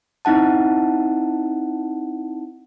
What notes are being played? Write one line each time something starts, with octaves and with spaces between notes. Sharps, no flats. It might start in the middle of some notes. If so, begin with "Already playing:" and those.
C4 D#4 E4 F#5 A5